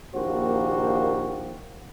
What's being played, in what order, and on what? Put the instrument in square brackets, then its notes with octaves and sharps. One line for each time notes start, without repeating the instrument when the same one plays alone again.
[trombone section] A#1 D#2 A#3 F#4 G4 C5